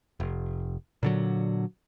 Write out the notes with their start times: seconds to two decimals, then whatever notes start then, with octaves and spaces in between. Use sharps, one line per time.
0.20 F1
1.03 A#2 D3 F#3